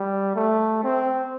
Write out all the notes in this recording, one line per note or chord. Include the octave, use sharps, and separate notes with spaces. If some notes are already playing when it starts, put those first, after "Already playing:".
Already playing: G3
A3
C4